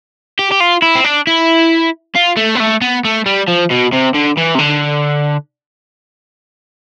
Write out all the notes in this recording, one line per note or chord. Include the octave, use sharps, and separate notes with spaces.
G4
G4
F4
E4
C4
D4
E4
F4
A3
B3
A3
B3
A3
G3
F3
B2
C3
D3
E3
C3
D3